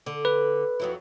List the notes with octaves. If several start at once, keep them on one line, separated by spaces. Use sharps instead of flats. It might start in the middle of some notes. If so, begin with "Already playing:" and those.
D3
B4
F2 F#3 E4